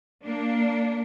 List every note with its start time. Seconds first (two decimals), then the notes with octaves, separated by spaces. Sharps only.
0.23 A#3 D4